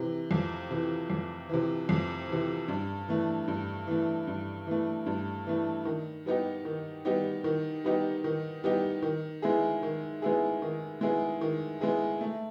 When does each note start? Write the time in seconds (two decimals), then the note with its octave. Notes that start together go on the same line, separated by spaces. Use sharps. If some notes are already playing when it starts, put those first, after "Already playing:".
Already playing: C3 E3
0.31 F2
0.71 C3 E3
1.10 F2
1.49 C3 E3
1.89 F2
2.29 C3 E3
2.68 G2
3.08 E3 A3
3.48 G2
3.87 E3 A3
4.27 G2
4.67 E3 A3
5.06 G2
5.47 E3 A3
5.85 D#3
6.26 G3 B3 D#4 G4
6.65 D#3
7.05 G3 B3 D#4 G4
7.44 D#3
7.85 G3 B3 D#4 G4
8.24 D#3
8.64 G3 B3 D#4 G4
9.02 D#3
9.42 G#3 B3 E4 G#4
9.83 D#3
10.22 G#3 B3 E4 G#4
10.62 D#3
11.01 G#3 B3 E4 G#4
11.41 D#3
11.81 G#3 B3 E4 G#4
12.21 A3